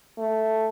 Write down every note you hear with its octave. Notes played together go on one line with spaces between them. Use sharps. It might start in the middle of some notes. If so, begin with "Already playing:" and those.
A3